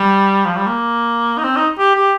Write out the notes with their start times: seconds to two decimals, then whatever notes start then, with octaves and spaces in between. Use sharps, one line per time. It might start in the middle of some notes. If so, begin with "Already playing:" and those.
Already playing: G3
0.45 F3
0.56 G3
0.67 A#3
1.38 D#4
1.44 C4
1.56 D#4
1.78 G4
1.95 G4